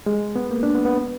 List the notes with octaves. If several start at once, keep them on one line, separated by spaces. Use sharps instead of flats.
G#3
B3
A#3
D4
B3
B3